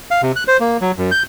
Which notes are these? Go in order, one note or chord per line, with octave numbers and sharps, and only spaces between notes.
F5
C3
F#6
C5
A#3
F#3
F#2
G6